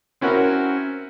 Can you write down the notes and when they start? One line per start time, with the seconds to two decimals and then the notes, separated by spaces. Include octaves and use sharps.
0.21 C4 C#4 E4 F#4 A#4